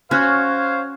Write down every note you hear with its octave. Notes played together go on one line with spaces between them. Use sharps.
C#4 F#4 C5 C#5 F5 F6 F#6 G#6